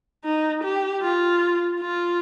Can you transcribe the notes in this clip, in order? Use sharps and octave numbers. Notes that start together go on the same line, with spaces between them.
D#4
G4
F4
F4